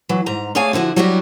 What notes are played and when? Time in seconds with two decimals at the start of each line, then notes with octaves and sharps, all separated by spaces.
0.09 E3 F#3
0.26 G#2 A#5
0.55 A3 G#4 C#5 D5 F5 G#5
0.73 D3 F3 E4 F#4
0.96 F#3 G3 D4 E4 F#4 G4